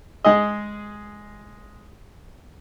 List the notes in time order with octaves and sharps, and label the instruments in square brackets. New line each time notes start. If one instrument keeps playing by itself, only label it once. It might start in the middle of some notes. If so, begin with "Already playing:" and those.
[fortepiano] G#3 G#4 D#5